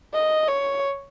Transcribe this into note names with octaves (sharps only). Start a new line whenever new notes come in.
D#5
C#5